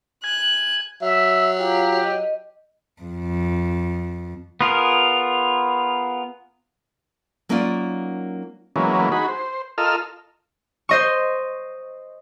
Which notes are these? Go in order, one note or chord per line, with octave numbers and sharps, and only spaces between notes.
G#5 F#6
F#3 E5
F4 G4 F5 A#5
D#5
F2
B3 F4 G#4 A#4
F#3 A#3 C#4 D#4 F4 D5
E3 F#3 G#3 A#3 B3 C#4
D#4 F#4 G#4 B5
C5
F4 A4 A#4 D#5 E6 F6
C5 D#5 C#6